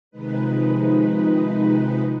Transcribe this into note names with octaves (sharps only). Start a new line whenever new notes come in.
C3 D#3 F3 G#3 D#4 B4